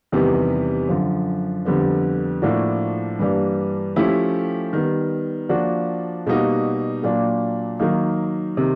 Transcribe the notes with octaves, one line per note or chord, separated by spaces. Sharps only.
E2 C3 D#3 G3 B3
F#2 D3 F3
F2 D3 G3 B3
A2 F3 A#3 D4 F#4
G2 E3 G3 A#3 D4
F3 A3 C#4 E4 G4
D#3 G3 B3
F3 A#3 D4 F#4
B2 G3 A#3 D#4 F#4
A#2 F#3 A#3 D4
D#3 F#3 A#3 D#4
C3 D#3